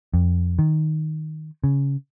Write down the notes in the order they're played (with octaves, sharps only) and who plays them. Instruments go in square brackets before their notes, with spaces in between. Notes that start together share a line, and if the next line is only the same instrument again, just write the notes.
[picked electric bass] F2
D#3
C#3